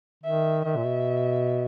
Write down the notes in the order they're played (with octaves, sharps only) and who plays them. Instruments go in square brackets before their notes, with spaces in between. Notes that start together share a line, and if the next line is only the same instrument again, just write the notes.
[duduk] D#3 [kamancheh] E5
[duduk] D#3 [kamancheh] E5
[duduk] A#2
B2